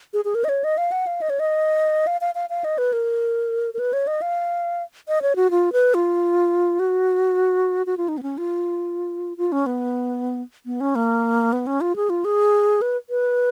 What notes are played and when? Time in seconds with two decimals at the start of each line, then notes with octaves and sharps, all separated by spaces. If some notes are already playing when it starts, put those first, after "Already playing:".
0.14 G#4
0.25 G#4
0.35 A#4
0.44 D#5
0.49 C#5
0.64 D#5
0.78 F5
0.92 F#5
1.07 F5
1.21 D#5
1.30 C#5
1.40 D#5
2.07 F5
2.21 F5
2.35 F5
2.50 F5
2.64 D#5
2.78 B4
2.93 A#4
3.74 A#4
3.79 B4
3.93 C#5
4.07 D#5
4.22 F5
5.08 D#5
5.22 C#5
5.36 F#4
5.51 F4
5.73 B4
5.94 F4
6.80 F#4
7.86 F#4
7.97 F4
8.08 D#4
8.18 B3
8.23 C#4
8.38 F4
9.37 F4
9.52 C#4
9.66 B3
10.66 B3
10.81 C#4
10.95 A#3
11.53 B3
11.67 C#4
11.81 F4
11.96 G#4
12.10 F4
12.25 G#4
12.82 B4
13.10 B4